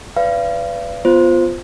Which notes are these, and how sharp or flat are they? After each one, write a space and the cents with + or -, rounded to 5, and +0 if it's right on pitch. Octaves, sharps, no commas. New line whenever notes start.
B4 +20 D5 -15 F5 -35
B3 +0 F4 -5 C5 +0